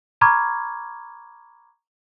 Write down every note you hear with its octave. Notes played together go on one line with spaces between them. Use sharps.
A#5 B5 C#6 D6 F6 G#6